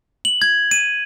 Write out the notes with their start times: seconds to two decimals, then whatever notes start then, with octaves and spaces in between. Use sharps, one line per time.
0.25 F#7
0.42 G#6
0.71 D#7